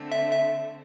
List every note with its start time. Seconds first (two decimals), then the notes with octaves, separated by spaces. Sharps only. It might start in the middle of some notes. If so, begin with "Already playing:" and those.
Already playing: D3 A3 C4
0.12 E5
0.31 E5